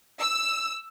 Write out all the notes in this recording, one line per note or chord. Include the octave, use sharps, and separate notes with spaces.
E6